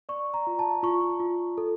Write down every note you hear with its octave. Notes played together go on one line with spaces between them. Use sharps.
D5 C#6
A#5
F4
A5
F4 C#6
F4
A4